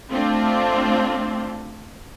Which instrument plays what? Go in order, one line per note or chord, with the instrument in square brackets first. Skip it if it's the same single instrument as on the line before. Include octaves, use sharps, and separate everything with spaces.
[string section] A3 C4 D4 F4